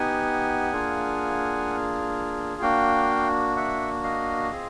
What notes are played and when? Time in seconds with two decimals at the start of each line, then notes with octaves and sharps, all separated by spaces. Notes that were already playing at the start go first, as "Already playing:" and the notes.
Already playing: B3 D#4 G4 F#5 G#5
0.72 A#3 D4 F4 G#4
2.62 A#3 D4 F#4 F5 G5
3.57 E5 F#5
4.04 D#5 F5
4.51 C4 F4 G#4